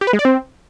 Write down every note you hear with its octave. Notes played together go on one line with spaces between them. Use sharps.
G4
B4
G#3
D5
C4